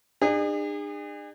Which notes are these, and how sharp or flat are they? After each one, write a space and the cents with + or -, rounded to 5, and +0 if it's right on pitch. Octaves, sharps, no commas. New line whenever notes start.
D4 +45 G#4 -35